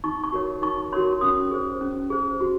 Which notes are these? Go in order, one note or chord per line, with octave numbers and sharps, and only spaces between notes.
D#4 C#6
C#6
F#4 A#4 C#5
D#4 C#6
F#4 A#4 C#5 C6
C#4 D#6
G#4 C5
C#4
G#4 C5
F#4